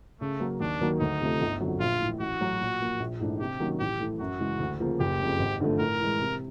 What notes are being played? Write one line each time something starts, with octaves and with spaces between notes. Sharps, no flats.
C#3 A3
F#3 A#3
D#2 D4
D#3 F#3 A#3
D2 D#4
C3 F3 A3
G1
F2 D3 F#3
A#1 F4
A2 E3
A1 F#4
A2 F#3
A#2
F3 A#3
A#1
G#2 E3 A3 D4
C3 G4
D#3 F#3 A#3 C#4
A1 G4
A2 E3 A3
F#2 F#4
C#3 E3 G#3
D2
C#3 F3 A#3
F#1 G4
F2 C#3
G#1
G2 D3 F3 A3
A2 A#4
E3 G#3
C3